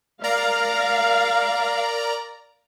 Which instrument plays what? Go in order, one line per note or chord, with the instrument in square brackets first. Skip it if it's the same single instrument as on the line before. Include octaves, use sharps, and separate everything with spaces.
[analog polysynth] A#4 D5 A#5 [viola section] F5